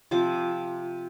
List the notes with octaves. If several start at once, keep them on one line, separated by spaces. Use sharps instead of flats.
C3 F3 D6